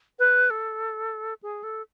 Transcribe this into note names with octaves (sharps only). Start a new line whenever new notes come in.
B4
A4
G#4
A4